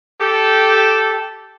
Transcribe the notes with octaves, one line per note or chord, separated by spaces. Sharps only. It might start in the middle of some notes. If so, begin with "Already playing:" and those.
G4 A4